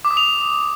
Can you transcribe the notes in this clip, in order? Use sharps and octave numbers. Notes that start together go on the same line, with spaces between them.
D6
D#6
F7